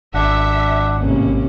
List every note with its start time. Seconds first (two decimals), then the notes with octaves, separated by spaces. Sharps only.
0.14 G#1 D4 E5 F#5
0.98 A1 C3 A#3 C#4